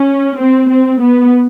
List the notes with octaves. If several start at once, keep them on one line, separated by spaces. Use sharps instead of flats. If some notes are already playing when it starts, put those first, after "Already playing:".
Already playing: C#4
C4
C4
B3